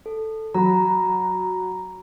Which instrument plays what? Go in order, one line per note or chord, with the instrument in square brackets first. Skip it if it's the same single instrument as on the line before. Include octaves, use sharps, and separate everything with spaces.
[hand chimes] A4
[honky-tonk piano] F#3 [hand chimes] A#5 B5